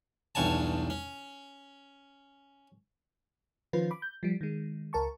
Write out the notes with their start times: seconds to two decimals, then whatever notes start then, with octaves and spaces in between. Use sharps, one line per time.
0.35 B1 E2 G2 C#5 G#5 A5
0.90 C#4
3.73 D#3 F3 C#4 F4 B4 C5
3.91 B5 D6
4.02 G6
4.23 F3 G3
4.41 D#3 G#3
4.93 C#2 A#4 A5 C#6